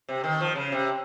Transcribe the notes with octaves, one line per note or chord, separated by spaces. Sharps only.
C3
D#3
F3
C#3
C3